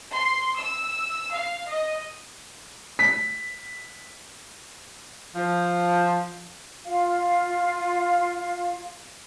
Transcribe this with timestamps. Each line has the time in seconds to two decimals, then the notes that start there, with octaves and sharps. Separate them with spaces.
0.12 C6
0.58 E6
1.33 F5
1.71 D#5
2.99 B6
5.35 F3
6.85 F4 F5